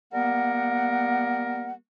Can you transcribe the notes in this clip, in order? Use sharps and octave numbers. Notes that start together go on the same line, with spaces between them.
G3 A#3 B3 A#4 F#5